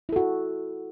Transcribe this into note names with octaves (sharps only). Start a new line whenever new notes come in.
E4 F#4 A4